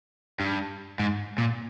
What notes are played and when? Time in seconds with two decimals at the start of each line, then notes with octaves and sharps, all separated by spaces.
0.40 G2
0.99 G#2
1.38 A#2